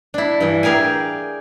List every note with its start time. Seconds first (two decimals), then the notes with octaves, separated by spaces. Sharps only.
0.14 D4 E4
0.40 G2 E3
0.63 G4 G#4 A#4 F5 G#5